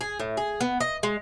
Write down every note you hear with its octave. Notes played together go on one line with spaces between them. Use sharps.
G#4
A2
G#4
B3
D#5
G#3